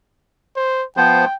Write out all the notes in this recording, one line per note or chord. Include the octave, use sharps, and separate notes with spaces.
C5
F3 B3 C5 G5